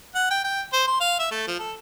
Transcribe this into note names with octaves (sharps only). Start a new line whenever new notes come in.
F#5
G5
G5
C5
C6
F5
E5
A3
F3
A4